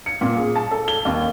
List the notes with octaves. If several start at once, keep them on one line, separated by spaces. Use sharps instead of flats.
C#7
A#2
G#4
A5
A4
G7
D#2